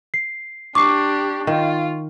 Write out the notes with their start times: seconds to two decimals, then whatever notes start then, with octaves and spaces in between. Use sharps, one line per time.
0.14 C7
0.75 D4 G4 C#6 D6 C7
1.47 D#3 F4